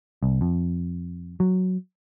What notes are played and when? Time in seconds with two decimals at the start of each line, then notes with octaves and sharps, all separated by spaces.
0.23 C2
0.41 F2
1.40 F#3